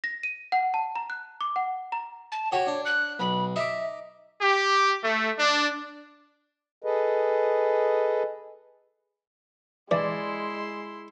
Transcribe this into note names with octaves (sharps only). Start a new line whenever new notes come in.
A#6
D#7
F#5
A5
A#5
F#6
D6
F#5
A#5
A5
F#4 G4 C#5
D4
F#6
B1 B5
D#4 E5 D6
G4
A3
D4
G#4 A4 B4 D#5
E3 G#3 E4 D5 C6